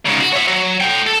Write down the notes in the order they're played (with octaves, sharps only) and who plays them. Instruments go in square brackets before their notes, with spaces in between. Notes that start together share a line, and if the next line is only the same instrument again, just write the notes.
[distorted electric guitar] G#2 C#3
F#4
C#5 E5
F#3
A3 G5
A4